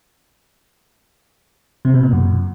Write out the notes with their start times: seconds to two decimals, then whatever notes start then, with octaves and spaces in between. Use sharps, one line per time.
1.85 C3
1.94 B2
2.03 A#2
2.13 F#2